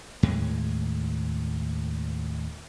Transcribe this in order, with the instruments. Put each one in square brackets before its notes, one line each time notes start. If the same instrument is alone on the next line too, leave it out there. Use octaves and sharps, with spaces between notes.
[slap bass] D#2 A2 G#3